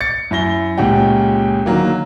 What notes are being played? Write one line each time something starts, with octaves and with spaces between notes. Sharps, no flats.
A6 C#7
F#2 E4 A#6 G7
C#2 A#2 C#4 G4 F#5 G5
D3 D#3 F#3 A#3